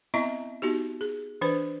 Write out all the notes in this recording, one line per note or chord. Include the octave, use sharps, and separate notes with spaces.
B3 C4 E4 D#5 E5 A#5
B3 D#4 F#4 G4
G#4
E3 D4 B4 C5